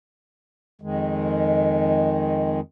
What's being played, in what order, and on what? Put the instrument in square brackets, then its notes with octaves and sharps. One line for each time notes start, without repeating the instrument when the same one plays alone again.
[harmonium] F2 D#3 G#3